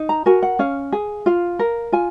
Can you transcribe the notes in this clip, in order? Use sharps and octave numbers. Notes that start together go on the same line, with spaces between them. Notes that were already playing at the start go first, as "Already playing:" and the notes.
Already playing: D#4
A#5
F#4 A#4 G#5
F#5
C#4 F5
G#4
F4 F5
A#4
F4 G#5